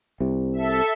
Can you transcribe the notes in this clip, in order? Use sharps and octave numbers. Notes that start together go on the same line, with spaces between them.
C2 C3
A4 E5